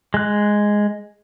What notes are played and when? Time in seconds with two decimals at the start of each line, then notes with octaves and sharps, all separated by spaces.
0.14 G#3 F#6